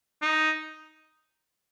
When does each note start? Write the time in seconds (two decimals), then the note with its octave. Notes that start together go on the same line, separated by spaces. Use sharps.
0.22 D#4